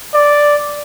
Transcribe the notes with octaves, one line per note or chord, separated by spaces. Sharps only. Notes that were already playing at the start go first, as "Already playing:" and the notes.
D5